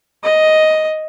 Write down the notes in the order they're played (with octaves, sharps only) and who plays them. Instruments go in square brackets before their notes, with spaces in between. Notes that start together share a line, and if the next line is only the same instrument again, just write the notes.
[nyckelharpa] D#5